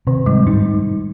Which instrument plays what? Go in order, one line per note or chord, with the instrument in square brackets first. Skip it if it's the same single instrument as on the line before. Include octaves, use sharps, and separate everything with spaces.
[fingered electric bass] C3 [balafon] D#3
[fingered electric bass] G#2 [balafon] G3
[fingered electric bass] G2 [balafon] D#4
[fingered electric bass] G#2